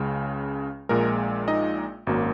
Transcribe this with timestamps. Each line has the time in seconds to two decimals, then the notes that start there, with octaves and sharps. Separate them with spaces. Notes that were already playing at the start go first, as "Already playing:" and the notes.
Already playing: C#2 C#3 G#3
0.89 A#1 A#2 G#3 A#4
1.48 D#4 D#5
2.07 G#1 F#2 F#3 A#3